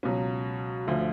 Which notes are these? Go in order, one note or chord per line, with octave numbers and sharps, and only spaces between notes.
C#2 B2 F#3 C#4
D2 D3 F3